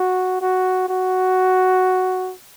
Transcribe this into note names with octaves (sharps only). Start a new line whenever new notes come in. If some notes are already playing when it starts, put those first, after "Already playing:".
Already playing: F#4
F#4
F#4